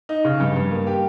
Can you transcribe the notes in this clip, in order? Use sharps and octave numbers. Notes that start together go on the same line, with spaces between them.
D#4
C#3
G2
G2
A#3
G4